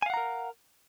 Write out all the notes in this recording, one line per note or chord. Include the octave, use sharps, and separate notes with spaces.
A#4 F5 F#5 G#5 A#5